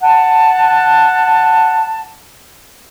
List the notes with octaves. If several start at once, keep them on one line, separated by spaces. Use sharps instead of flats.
F#5 A5